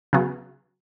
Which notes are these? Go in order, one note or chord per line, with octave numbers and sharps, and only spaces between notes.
C#3 F#3 B3